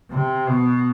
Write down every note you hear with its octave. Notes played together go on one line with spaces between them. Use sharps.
C3
B2